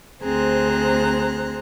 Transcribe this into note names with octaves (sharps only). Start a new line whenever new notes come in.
D2 C4 G#4 C5 A#5 F#6